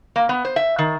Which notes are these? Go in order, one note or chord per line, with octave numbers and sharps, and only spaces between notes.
A#3
B3
C5
E5
D#3